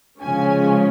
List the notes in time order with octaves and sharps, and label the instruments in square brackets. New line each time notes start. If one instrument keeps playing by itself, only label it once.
[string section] C#3 F3 G#3 C#4 G#5